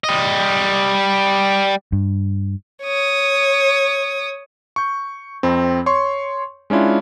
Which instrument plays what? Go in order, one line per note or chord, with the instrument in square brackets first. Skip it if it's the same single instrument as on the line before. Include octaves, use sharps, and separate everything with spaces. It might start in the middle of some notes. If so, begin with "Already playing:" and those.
[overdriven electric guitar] G3 D#5
[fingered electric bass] G2
[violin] C#5 D#6
[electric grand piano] C#6 G6
F2 C4
C#5 C6 C#6
G#3 C#4 D4 E4 F4